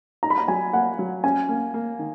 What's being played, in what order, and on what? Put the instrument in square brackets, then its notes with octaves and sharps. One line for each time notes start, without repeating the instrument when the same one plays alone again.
[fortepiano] D#4 [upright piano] A#5
[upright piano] B5
A#5
[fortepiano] F#3 [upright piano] G#5
[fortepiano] A#3 [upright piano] F#5
[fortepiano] F#3
[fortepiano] C#4 [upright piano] G#5
[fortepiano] A#3
A#3
D#3